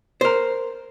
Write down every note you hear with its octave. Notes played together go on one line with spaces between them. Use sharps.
A#4 C5